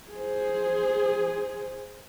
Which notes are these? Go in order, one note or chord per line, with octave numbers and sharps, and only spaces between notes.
G#4 C5